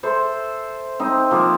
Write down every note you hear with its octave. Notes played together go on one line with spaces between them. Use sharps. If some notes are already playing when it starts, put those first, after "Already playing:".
A4 C5 E5
C4 D#4
F3 A#3